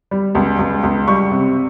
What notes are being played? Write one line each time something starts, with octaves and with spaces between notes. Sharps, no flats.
G3
C#2
C#2
C#2
G3 C#6
C3